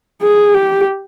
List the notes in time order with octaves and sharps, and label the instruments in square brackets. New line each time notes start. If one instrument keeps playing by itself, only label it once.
[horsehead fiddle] G#4
G4